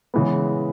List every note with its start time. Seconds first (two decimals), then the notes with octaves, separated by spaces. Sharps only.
0.14 C#3 E3 G#3 B3